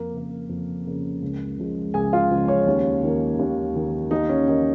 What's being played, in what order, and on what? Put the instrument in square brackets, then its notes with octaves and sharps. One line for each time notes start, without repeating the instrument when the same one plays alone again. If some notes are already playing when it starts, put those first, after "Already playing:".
Already playing: [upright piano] F2 A#3 A#4
C#3 A#3
F2
C#3 A#3
C#2
C#3 F3 G#3
C#2 G#4 G#5
F4 F5
C#3 F3 G#3
C#4 C#5
D#2
D#3 A#3
D#2
D#3 A#3
D#2 D#4
C#4
D#3 A#3 D#4